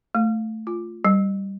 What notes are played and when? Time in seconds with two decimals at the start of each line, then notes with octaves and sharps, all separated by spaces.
0.15 A3
0.67 F4
1.05 G3